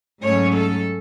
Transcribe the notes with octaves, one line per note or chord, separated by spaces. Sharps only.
G#2 F#3 A3 C#4 C#5
A4